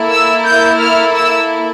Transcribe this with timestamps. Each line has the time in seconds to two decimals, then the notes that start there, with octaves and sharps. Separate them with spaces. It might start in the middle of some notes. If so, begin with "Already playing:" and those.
Already playing: A#3 E4 A4
0.10 E6
0.45 G6
0.80 F6
1.15 E6